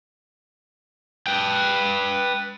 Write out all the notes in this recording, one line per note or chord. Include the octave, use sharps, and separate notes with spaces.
B4 G5